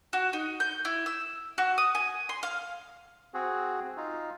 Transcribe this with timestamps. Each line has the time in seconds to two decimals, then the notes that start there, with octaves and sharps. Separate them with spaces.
0.13 F#4
0.33 D#4
0.60 G6
0.85 E4
1.06 E6
1.58 F#4
1.78 D#6
1.95 G#5
2.29 C6
2.43 F5
3.34 C4 F#4 G#4
3.97 D#4 F4